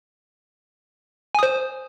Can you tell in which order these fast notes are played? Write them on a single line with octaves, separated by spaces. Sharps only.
G#5 D#6 C5